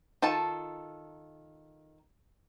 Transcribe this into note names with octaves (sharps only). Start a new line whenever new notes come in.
D#3 F4 A4 A5